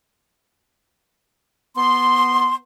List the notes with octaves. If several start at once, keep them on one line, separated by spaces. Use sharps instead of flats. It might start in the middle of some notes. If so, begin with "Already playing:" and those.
B3 C6